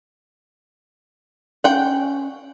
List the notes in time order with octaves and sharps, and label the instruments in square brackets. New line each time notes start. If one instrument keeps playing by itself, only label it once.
[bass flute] C#4 [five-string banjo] F#5 G5